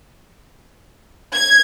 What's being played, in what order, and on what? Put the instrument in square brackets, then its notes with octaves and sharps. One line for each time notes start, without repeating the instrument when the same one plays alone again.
[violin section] G#6